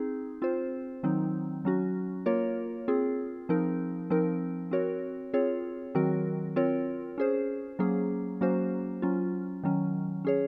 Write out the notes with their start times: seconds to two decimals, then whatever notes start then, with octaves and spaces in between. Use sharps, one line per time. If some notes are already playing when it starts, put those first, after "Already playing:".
Already playing: C4 D#4 G#4
0.42 C4 F4 C5
1.03 D#3 F#3 C4 D#4
1.65 F#3 C#4 F#4
2.26 A#3 F4 A#4 C#5
2.88 C4 F4 G#4
3.49 F3 C4 D#4 A#4
4.10 F3 C4 D#4 A#4
4.71 C4 F#4 A#4 C#5
5.34 C4 F4 G#4 C#5
5.95 D#3 F#3 C4 F#4 A#4
6.56 C4 F4 A#4 C#5
7.18 C#4 G#4 C5
7.79 F#3 A#3 C#4 G#4
8.41 F#3 A#3 C#4 F#4 C5
9.02 F#3 C#4 F4
9.63 D#3 F#3 C#4
10.25 C#4 G#4 C#5